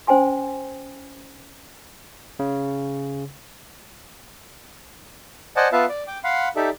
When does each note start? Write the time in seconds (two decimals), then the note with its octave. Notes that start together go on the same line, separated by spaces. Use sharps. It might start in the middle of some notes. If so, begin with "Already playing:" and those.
0.07 C#4 C5 G5 G#5 C6
2.39 C#3
5.56 C5 D5 D#5 F#5 G#5 A5
5.73 B3 F4 B4 E5 F5 A5
5.89 D5
6.07 G5 D6
6.24 F5 F#5 B5 C6
6.56 D#4 G4 A4 D5 E5